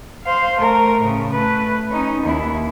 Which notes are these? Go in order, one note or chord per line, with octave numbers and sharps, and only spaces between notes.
C5 F5
A3 A#4
A2 C#3
A3 B4
C#4 D#4
D#2 E4